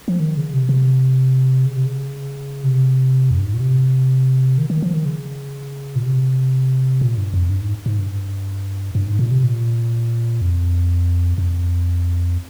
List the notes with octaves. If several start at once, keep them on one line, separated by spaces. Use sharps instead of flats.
F3
D#3
C#3
C3
C3
C#3
C3
C#3
C3
F2
G2
G#2
A#2
C3
D#3
D#3
F3
D#3
C#3
A#2
C3
A#2
G2
F2
G2
G#2
G#2
G2
G2
G#2
A#2
C3
A#2
F2
F2